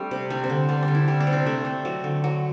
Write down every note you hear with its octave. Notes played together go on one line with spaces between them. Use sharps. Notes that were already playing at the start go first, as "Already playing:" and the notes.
Already playing: G3 A3 C4 D4
C3
G3 D4
C4
D3
G3 D4
D4
D3
E4
G3 D4
D4
C3
C4
A3 D4
A3
F#3
D3
F#3